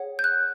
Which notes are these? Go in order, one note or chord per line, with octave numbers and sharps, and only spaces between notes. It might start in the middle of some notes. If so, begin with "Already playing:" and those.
Already playing: G#4 C#5 F#5
G6
F#6